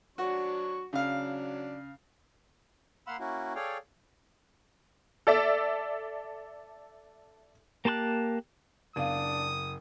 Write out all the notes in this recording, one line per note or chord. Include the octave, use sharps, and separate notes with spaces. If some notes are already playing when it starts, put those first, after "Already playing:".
F#3 D4 F#4 C#6
C#3 F#3 D4 F5
A#3 F5 F#5 B5 C6 E6
A#3 C#4 E4 F#4
G#4 A4 C#5 D5 F5 G5
A4 D5 E5
A#3 G4 A5 C6 F#6
F#1 B3 D4 F5 D#6 D#7